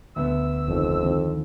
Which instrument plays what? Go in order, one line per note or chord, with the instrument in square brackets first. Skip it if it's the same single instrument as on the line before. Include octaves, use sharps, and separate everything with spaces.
[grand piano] D2 B3 [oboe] E6
[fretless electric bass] F1 D#3 [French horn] F2
[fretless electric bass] D2 D#3 C4